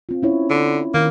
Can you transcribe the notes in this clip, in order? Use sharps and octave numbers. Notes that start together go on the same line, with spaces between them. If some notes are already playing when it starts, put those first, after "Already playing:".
C4 F4
C#4 E4 C#5
D3
D#3 A#3